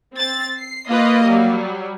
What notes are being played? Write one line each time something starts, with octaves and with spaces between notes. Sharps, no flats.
C4 A6
C7
A#3 F4 B4 D#5
F#3 G3